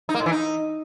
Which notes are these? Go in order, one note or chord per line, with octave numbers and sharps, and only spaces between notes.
D#4
A#3
A2
E3
D#4